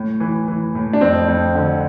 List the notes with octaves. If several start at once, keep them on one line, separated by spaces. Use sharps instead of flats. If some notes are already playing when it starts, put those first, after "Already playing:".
Already playing: A2
E3
E3
A2
D4
F2 C4
F2
D3